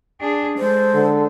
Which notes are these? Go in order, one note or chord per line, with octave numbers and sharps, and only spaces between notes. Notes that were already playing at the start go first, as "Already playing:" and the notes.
D4 G#4
G#3 A4 C5
D3